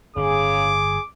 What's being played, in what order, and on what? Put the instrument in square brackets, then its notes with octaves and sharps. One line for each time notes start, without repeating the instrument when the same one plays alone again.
[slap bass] G1 A2 [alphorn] C#3 [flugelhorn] G#4 [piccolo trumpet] D6